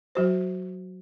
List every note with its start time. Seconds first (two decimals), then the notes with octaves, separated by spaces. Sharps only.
0.15 F#3 F#4 C5